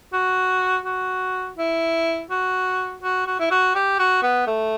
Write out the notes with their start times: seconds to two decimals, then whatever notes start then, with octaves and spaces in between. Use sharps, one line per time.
0.13 F#4
0.85 F#4
1.58 E4
2.30 F#4
3.02 F#4
3.26 F#4
3.40 E4
3.51 F#4
3.75 G4
3.99 F#4
4.22 B3
4.47 A3